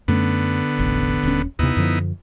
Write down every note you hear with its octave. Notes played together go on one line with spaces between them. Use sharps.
F#2 D3 A3 B3 C#4
E1 A1
D#1 C#4
D#2 C3 B3 D#4 E4
F#2 D3 F3